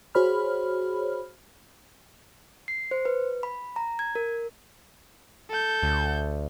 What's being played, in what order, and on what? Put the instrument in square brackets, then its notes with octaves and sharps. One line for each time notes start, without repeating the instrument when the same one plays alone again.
[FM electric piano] F#4 G#4 C5 C#5 B5 F6
[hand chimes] C7
C5
B4
B5
A#5
G#6
A#4
[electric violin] A4 G6
[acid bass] D2